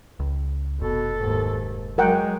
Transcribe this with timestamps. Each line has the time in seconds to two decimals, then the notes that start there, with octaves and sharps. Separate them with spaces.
0.20 C#2
0.80 F1 B2 A4
1.19 D#2 G#2
1.98 F#3 G#3 A#4 F#5 G5